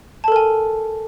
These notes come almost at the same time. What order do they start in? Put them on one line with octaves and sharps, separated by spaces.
A5 A4 A#4 G#5